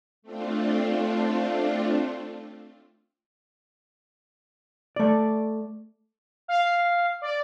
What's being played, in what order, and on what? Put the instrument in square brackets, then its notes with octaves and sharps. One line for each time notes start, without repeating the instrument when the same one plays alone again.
[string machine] A3 C4 D4 F4
[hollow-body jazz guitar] A3 D5
[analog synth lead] F5
D5